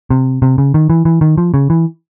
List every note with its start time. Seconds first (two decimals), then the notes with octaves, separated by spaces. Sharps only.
0.10 C3
0.42 C3
0.58 C#3
0.74 D#3
0.90 E3
1.05 E3
1.21 D#3
1.38 F3
1.54 C#3
1.70 E3